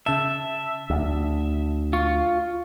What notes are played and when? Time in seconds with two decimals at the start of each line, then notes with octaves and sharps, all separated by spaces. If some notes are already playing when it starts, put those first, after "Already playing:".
0.06 C#3 E5 A5
0.90 D2
1.93 F4 C#6